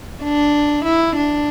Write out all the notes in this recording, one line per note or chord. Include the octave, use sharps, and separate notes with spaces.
D4
E4
D4